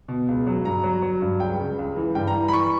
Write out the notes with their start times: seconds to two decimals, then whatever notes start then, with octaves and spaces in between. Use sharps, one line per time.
0.08 B2
0.28 C#2
0.47 F#3
0.65 G2 A#5
0.84 F#3
1.02 F#3
1.22 G2
1.40 C#2 G5
1.60 C#3
1.79 C#2
1.96 E3
2.15 G2 G5
2.27 A#5
2.35 E3
2.48 B5
2.53 E3 C#6